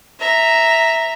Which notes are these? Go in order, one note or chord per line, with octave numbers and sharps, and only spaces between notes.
E5 A#5